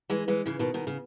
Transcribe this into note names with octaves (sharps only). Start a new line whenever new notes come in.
E3 G#3
E3 G#3
C#3 E3
B2 D#3
B2 D#3
C#3